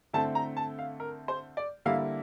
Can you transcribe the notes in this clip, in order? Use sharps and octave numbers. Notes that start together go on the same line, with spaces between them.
D3 A3 C4 E4 A5
A#5
A5
F5
A#4
C5
D5
D3 G3 A#3 E4 F5